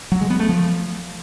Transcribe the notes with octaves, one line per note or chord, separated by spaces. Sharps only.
F#3
G#3
B3
A3
F3